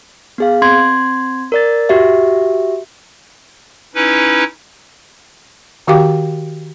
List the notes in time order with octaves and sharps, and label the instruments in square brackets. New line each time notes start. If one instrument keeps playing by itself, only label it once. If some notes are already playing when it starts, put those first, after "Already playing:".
[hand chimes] B3 G#4 F5
C4 C6 G#6
A#4 D5 A6
F#4 G4 E5
[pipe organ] C#4 D#4 E4 B4
[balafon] D#3 F#4 G4 F5 G5 D6